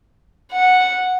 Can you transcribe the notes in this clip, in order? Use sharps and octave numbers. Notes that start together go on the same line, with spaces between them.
F#5